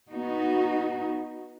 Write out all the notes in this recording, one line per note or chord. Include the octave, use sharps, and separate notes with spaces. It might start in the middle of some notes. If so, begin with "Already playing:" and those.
B3 D#4 F#4